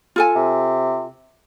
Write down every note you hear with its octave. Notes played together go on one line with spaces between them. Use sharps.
F4 A4 G#5
C3